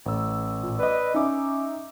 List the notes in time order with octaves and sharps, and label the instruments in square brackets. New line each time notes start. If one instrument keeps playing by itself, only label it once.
[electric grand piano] A1 E6
[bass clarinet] A#2
[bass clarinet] B4 [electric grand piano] D5 D#5
[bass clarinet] C#4 [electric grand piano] D#4 E5 D6